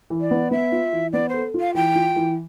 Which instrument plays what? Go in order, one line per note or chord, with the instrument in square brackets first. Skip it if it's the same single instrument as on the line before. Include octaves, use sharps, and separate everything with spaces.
[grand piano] E3
[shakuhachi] D5
[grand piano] B3
[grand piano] B3 [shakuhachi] E5
[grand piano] F4
E3
[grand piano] B3 [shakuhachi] D5
[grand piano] A4 [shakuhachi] C5
[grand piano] F4
[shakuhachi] F5
[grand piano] E3 [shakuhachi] G5
[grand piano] F4
E3